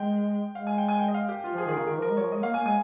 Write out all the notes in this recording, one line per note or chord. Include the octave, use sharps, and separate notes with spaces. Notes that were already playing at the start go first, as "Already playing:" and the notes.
Already playing: G#3 G5
G#3 F5
G#5
G5
G#5
G5
D#5
F5
G4
F4
F3 G#4
D#3 G#4
C#3 A#4
D#3 A#4
F3 A#4
G#3
F3 C#5
G#3 D#5
A#3 F5
A#3 G#5
G#3 G#5